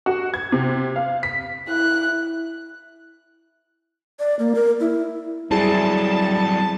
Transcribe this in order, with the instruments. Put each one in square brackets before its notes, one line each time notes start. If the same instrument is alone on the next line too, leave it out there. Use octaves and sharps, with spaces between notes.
[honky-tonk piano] F#4
G#6
C3
F5
B6
[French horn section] E4 [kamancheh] F#6
[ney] D5
A#3
A#4
E4
[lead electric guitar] F#3 C4 [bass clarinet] G3 [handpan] E4 G#4 [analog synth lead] A5